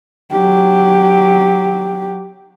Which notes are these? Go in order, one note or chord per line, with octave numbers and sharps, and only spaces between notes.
F#3 G4